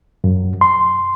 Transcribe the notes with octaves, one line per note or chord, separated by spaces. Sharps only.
F#2
C6